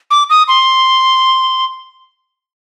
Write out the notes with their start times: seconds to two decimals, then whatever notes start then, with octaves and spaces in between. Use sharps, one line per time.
0.11 D6
0.30 D#6
0.48 C6